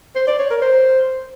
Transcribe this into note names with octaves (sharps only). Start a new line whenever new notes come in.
C5
D5
C#5
A#4
C5